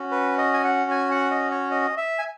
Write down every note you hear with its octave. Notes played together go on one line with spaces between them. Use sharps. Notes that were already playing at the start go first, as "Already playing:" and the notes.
Already playing: C#4 F#4
B4
D#5
G#5
F#5
G#5
F#5
D#5
C#5
D#5
E5
G#5